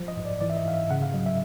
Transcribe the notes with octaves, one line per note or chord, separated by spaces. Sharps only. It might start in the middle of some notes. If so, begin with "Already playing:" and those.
Already playing: F3
D#5
G#2
D5
E3 D5
E5
D#5
G#2 F5
E5
C#3 F#5
F5
F#3 D#5
E5